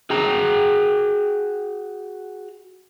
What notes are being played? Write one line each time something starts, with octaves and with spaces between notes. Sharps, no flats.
F#4 G#4 G5 A#5